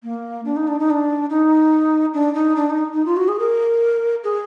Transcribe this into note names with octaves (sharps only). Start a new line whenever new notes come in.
A#3
D4
D#4
D4
D#4
D4
D#4
D4
D#4
D4
D#4
D#4
F4
F#4
G#4
A#4
G#4